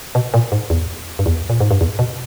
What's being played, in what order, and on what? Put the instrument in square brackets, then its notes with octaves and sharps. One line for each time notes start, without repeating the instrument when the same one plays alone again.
[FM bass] B2
A#2
G#2
E2
G2
E2
A#2
G#2
G2
E2
B2